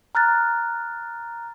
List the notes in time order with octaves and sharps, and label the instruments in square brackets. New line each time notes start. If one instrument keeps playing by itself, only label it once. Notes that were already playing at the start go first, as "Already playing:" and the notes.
[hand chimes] A#5 F6 F#6 A6